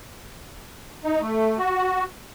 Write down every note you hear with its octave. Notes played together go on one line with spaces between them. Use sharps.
D#4
A3
F#4